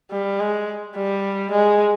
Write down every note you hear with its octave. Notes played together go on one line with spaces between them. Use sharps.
G3
G#3
G3
G#3